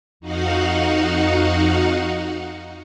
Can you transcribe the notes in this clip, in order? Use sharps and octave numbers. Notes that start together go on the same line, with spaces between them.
F2 D#4 F#4 F5 F#5